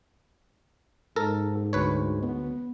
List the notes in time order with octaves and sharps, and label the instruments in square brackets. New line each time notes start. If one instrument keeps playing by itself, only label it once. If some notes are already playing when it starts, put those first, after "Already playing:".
[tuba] G#2 [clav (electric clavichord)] A4 A#4
[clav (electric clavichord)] D2 B4 C#5
[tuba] B3